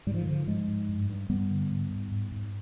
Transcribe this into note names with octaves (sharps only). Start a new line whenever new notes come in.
G#2 G3
F3
D#3
G#2 D3 F3
G#2 F3 G#3
G#2
G2
G2
G2 G3 B3
D3
G#2
G#2
G#2
G#2